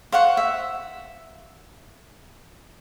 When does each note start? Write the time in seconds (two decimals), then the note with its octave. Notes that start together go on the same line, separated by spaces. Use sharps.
0.12 C5 F5 F#5 C#6
0.37 E5